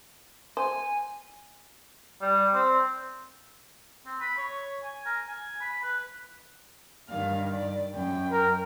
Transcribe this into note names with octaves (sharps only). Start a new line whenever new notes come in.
C5 G#5
G3
C4
C4
B5
C#5
G#5
A#4
G#5
B5
B4
G2 D#3 F5
D5
F#2 G5
A#4